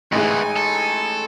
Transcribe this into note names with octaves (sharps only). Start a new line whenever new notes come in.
A1 G#2 E3 G#3 D#4 G#5
A4